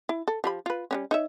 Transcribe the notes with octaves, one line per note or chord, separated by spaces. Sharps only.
E4
A4
F3 G4 B5
F4 B4
G3 B3 C#4
D#4 C#5 E5